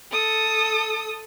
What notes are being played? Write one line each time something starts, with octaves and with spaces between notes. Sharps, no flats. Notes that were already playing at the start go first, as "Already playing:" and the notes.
A4 D#6